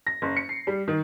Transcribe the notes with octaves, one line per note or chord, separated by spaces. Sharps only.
A#6
F#1
C#7
C7
G3
D#3